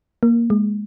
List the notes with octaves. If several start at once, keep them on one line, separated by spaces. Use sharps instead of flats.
A#3
G#3